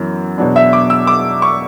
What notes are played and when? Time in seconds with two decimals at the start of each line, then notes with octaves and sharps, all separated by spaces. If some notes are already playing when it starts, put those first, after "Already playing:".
Already playing: F#2 E3 B3
0.38 E2 B2 F#3 B3 D4
0.56 E5
0.73 D6
0.90 E6
1.07 D6
1.42 C#6